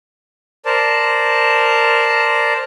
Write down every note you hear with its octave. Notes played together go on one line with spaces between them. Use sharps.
A#4 C5 D5 A5